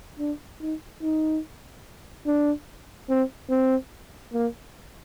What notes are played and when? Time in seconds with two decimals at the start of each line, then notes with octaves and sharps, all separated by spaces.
0.19 D4
0.61 D#4
1.02 D#4
2.27 D4
3.09 C4
3.50 C4
4.33 A#3